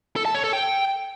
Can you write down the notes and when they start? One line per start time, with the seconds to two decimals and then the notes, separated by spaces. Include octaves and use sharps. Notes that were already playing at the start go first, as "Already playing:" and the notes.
0.16 A4
0.25 A5
0.35 C#5
0.44 A4
0.53 G5